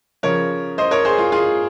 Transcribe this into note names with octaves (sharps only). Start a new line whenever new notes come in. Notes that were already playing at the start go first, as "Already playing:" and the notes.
C#3 F3 A#4 C#5
C5 D#5
A#4 C#5
G#4 C5
F4
F4 G#4